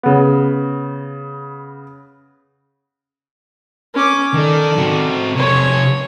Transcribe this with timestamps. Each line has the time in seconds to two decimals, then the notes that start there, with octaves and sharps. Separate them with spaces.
0.03 C#3 B3
3.94 C#4 D6
4.34 D#3 A4 D5
4.79 C4 F#4
5.36 C3 A4 C#5